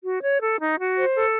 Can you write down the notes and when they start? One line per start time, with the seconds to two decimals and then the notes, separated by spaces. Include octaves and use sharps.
0.05 F#4
0.22 C#5
0.41 A4
0.60 D#4
0.78 F#4
0.97 C5
1.14 A4